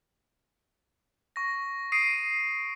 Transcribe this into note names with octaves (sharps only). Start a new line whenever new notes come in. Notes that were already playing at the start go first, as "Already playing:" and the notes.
C#6 A#6
D#6 C7 D7 D#7